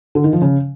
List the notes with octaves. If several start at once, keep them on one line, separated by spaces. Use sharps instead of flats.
D3
D#3
F3
C#3